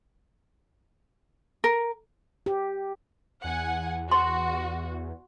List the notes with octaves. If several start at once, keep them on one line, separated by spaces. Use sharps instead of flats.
A#4
G4
E2 F#5 G#5
F#4 C6